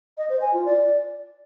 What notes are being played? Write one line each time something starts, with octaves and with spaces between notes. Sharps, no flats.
D#5
C5
G#5
F4
D5